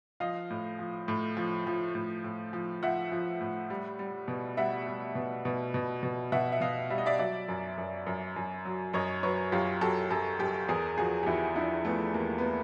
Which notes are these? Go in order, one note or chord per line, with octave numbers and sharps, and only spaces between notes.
F3 D#5 F5
A2
F3
A2
F3
F3
A2
A2
F3
F3 E5 F#5
F3
A2
G3
G3
B2
G3 E5 F#5
G3
B2
B2
B2
B2
B2 E5 F#5
E5
B2 D#5 F5
G3 E5
D#5
D5 E5
F#3 D5 E5
F#2
F#2
F#2
F#2
F#3
F#2 C#5 D#5
F#3 B4 C#5
F#2 F4 G4
F#3 G4 A4
F#2 G4 A4
F#2 G4 A4
E2 G#4 A#4
F3 F#4 G#4
G4
E2 E4 F#4
F3 D4 E4
F3 A3 B3
E2 A#3
B3
A#3